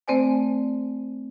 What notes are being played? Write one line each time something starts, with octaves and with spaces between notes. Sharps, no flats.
A3 C4 C5 D5 G#5